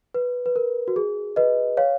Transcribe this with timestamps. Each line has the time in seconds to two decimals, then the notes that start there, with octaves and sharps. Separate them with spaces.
0.14 B4
0.46 B4
0.56 A#4
0.88 F#4
0.96 G#4
1.36 B4 D#5
1.77 C#5 F5